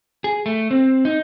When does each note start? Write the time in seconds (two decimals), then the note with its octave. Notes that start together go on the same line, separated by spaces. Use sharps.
0.24 G#4
0.46 A3
0.71 C4
1.05 D#4